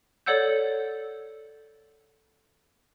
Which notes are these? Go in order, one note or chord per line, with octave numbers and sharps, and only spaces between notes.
A4 C#5 D5 F#5 E6 G6